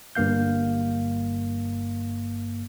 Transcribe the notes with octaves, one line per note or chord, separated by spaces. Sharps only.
G1 G2 A#3 F5 G6